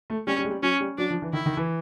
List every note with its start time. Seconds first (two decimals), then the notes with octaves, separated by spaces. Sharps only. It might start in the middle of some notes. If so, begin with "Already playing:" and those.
0.10 A3
0.27 G3 C#4
0.39 G3
0.45 G#3
0.50 G3
0.62 F#3 C#4
0.80 G3
0.98 F#3 D4
1.10 F3
1.22 E3
1.33 D#3 E4
1.46 D#3
1.57 E3